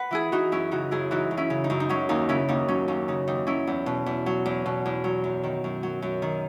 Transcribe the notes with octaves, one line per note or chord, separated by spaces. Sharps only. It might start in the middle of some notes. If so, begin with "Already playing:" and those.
Already playing: B4 F#5
E3 E4 G#4
E3 D#4 F#4
F#2 C#4 E4
C#3 D#4 F#4
F#2 E4 G#4
E3 D#4 F#4
F#2
C#4 E4
C#3
D#4
F#2
D#4
F#3 C#4
D#2 D#4
C#3 C#4 E4
D#2 D#4
F#3 C#4
D#2 C#4
C#3 D#4
D#2 D#4
F#3 C#4 E4
E2
B2
E2
F#3
E2
B2
E2
F#3
F#2
D#3
F#2
F#3
F#2
D#3